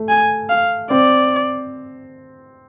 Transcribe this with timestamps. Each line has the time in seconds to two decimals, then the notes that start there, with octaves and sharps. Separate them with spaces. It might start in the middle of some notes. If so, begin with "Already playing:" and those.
Already playing: A3
0.09 G#5
0.49 F5
0.90 C4 D5